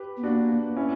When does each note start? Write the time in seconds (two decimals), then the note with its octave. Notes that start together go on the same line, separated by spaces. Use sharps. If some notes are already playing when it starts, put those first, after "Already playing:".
Already playing: G4 B4
0.17 B3
0.23 A#3 D4 F#4
0.76 C#4 E4